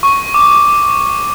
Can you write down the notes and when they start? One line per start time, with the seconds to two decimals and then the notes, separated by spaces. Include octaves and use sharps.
0.03 C#6
0.34 D6